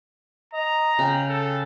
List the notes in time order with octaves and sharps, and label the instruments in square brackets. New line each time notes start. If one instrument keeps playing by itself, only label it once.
[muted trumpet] D#5 [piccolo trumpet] A#5
[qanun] C#3 [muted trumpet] G5
[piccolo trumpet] A4